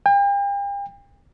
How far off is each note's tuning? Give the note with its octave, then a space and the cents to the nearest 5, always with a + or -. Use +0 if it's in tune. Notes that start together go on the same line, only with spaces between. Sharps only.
G5 +40